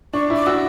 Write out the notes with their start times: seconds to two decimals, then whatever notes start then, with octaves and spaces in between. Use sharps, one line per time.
0.13 D4 C#6
0.30 E4
0.36 D6
0.46 F#4 E6